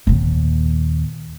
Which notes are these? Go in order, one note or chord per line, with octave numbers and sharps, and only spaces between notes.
D#2 A#2